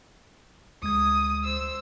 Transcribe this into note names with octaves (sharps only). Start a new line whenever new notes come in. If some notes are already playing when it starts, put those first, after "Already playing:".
D2 G#3 D#6 G#6
C5 E6